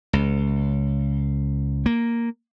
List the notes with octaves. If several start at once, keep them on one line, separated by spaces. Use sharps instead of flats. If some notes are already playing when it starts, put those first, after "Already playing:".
C#2
A#3